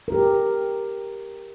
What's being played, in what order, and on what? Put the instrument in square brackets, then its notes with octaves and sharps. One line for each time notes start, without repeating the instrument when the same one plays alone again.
[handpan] G4 A#4